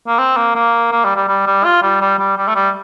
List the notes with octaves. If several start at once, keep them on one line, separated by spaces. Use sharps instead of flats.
A#3
C4
A#3
A#3
A#3
G3
G3
G3
G3
F4
G3
G3
G3
G3
A3
G3